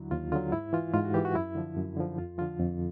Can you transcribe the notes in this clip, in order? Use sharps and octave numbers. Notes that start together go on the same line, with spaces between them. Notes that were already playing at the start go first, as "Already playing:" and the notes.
Already playing: D#2 D3 F#3 E4
D#2 F4
D3 F#3 F4
G#2 E4
E3 F4
G#2 F4
F#4
E3 G4
F#4
F#2 E4
D3 F3
F#2
D3 F3
F2 F4
D3 F3 F4
F2